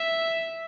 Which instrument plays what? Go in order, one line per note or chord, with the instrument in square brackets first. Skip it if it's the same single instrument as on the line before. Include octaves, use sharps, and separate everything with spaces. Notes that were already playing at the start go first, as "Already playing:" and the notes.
Already playing: [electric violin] E5